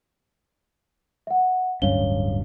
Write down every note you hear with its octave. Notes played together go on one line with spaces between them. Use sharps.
E5 F#5
D1 G2 C#4 C#5 F5 G7